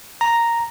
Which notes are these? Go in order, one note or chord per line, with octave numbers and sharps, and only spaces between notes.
A#5